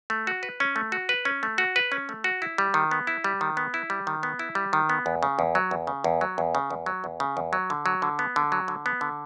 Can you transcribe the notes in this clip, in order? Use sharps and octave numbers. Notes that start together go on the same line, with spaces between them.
A3
F#4
B4
C#4
A3
F#4
B4
C#4
A3
F#4
B4
C#4
A3
F#4
E4
G3
D#3
B3
E4
G3
D#3
B3
E4
G3
D#3
B3
E4
G3
D#3
B3
E2
C#3
E2
F#3
E2
C#3
E2
F#3
E2
C#3
E2
F#3
E2
C#3
E2
F#3
D3
F#3
D3
B3
D3
F#3
D3
B3
D3